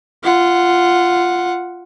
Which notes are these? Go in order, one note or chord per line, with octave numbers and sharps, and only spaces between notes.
F4 F#5